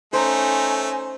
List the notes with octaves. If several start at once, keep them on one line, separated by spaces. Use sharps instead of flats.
A3 C#4 D#4 C5 G#5